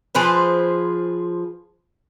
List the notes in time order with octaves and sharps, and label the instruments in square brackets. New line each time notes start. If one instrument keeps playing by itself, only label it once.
[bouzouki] F3 G#4 B4 C5